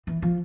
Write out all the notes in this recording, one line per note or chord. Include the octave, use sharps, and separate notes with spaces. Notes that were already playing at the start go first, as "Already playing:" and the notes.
E3
F3